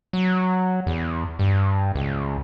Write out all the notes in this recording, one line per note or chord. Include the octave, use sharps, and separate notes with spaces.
F#3
E2
G2
C#2